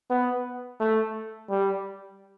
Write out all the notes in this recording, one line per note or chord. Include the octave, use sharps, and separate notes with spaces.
B3
A3
G3